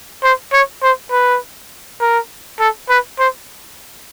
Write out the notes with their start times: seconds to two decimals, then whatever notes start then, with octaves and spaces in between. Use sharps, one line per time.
0.23 C5
0.53 C#5
0.83 C5
1.11 B4
2.01 A#4
2.59 A4
2.89 B4
3.18 C5